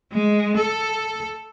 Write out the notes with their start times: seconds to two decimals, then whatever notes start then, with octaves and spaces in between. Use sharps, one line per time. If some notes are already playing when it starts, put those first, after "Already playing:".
0.12 G#3
0.57 A4